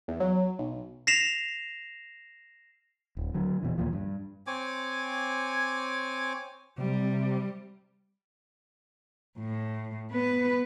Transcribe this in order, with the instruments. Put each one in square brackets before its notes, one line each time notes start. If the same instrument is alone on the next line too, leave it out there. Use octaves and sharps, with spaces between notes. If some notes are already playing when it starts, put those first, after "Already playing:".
[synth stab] E2
F#3
B1
[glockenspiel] A#6 C7 E7 F7
[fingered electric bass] D1
D3 F#3
E2 B2 E3
D#2 A#2 F3
G2
[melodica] C4 C#5 G#5 D6
[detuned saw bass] C3 [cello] G3
[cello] A2
B3 B4